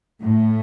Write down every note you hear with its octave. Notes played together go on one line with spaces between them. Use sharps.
A2